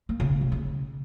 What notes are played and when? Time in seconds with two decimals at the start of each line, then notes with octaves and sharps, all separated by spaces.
0.09 A#3
0.20 C#3
0.30 G#3
0.41 C3
0.52 C#3